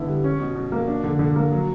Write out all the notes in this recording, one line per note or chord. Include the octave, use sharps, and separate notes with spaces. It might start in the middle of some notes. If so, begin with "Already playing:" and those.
Already playing: D3 B3 E4
G3
C#4
B2
B2
A#3
D4
D3
D3
A#3
F#3